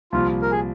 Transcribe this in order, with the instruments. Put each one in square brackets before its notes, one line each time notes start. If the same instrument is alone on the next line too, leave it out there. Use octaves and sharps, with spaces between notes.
[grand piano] C2 A#2 F3 [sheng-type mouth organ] F4
[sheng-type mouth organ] A#4
G#4